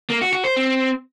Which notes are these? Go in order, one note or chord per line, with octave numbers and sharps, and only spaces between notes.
A#3
F#4
F#4
C5
C4